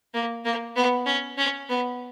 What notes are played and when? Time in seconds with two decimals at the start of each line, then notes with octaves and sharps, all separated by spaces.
0.14 A#3
0.45 A#3
0.76 B3
1.06 C#4
1.38 C#4
1.69 B3